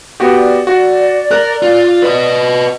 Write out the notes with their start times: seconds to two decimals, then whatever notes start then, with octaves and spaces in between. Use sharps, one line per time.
0.20 B3 F#4 G4 D5
0.67 F#4
1.31 A#4 F#6
1.63 F4
2.02 B4 D#5